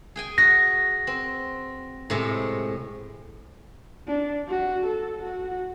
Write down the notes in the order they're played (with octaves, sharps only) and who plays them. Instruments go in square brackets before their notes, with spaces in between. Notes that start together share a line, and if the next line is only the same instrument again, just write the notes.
[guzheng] G#4 G5 G#5
[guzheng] F#4 [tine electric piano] A#6
[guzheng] C4
A2 C3 G#3
[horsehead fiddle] D4
F#4
A4
F#4